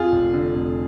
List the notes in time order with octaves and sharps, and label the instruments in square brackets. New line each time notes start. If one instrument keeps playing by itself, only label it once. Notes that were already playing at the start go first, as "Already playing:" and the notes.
Already playing: [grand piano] F2 F4 G#4
F1
D3
F1